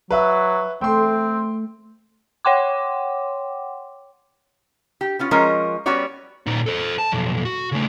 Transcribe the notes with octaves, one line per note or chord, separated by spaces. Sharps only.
F#3 B4 E5
A3 C4 G5 C6
C#5 F#5 G5 C6 D6
G4
B3 C#4 F4
F3 G#3 C#4 A#4 D#5
G3 B3 C#4 F#4 C#5 D5
A#2 D#4
A4 C5
A5
B1 F2
F#4
C#3 A3